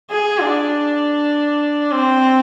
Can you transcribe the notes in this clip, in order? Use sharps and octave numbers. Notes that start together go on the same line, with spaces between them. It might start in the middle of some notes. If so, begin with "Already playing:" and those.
G#4
D4
C4